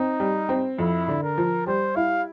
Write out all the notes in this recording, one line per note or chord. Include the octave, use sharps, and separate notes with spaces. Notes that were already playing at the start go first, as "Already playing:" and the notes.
Already playing: C4 D#4
G3
C4
F2 E4
D3
A#4
F3
G3 C5
E4 F5